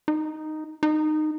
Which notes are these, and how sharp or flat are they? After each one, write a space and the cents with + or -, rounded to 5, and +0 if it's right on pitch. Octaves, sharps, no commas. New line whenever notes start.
D#4 -5
D#4 -15